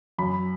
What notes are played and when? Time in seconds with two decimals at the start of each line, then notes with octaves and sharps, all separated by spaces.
0.18 F#2 B5